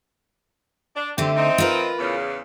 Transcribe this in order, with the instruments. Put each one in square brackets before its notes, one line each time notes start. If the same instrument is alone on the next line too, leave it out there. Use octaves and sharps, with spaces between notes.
[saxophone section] D4
[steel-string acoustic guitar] D3 A3 [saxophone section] C4 G4
[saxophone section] C4 D#4
[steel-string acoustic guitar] F4 A#4 B4
[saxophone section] E2 C#3